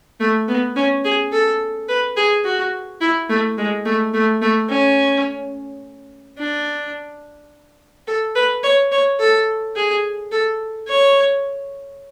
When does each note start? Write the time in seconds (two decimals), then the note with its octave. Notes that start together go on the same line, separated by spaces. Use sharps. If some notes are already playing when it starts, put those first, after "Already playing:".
0.20 A3
0.48 B3
0.76 C#4
1.05 G#4
1.32 A4
1.89 B4
2.17 G#4
2.45 F#4
3.01 E4
3.29 A3
3.58 G#3
3.85 A3
4.14 A3
4.42 A3
4.70 C#4
6.39 D4
8.07 A4
8.35 B4
8.63 C#5
8.92 C#5
9.20 A4
9.76 G#4
10.32 A4
10.88 C#5